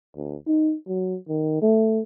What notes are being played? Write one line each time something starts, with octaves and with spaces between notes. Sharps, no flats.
D2
D#4
F#3
D#3
A3